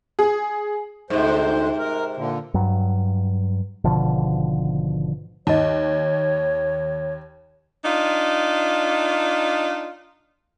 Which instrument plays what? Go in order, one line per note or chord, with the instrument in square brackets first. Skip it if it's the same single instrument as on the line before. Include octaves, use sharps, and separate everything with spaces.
[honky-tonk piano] G#4
[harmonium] D2 C5 [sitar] G#2 C3
[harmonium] A#4
A#2 D3
[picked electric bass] G2 F#3
G#1 B2 D3 F3
[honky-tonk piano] D#2 [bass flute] C#5 [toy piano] D#5 A5
[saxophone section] D4 D#4 F4